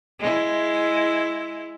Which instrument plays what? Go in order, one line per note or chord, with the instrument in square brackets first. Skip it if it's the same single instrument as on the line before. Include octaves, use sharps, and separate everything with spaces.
[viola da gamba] G#3 E4